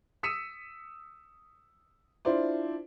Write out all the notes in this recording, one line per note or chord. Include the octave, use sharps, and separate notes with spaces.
D#6 E6 B6 C#7 D#7 E7
D4 E4 F4 C5 D5